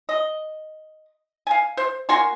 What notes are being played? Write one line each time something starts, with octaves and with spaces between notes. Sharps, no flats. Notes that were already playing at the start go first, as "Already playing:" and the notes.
D#5
F5 G#5
C5
A#3 F#4 G#5 C6